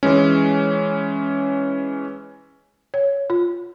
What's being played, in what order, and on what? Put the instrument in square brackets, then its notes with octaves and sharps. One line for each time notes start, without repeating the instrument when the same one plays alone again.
[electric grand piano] E3 G#3 C#4
[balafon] C#5
F4